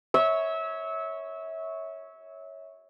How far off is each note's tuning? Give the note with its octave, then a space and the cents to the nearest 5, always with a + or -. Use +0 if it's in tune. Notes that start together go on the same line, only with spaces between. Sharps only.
C#5 +0 E5 -25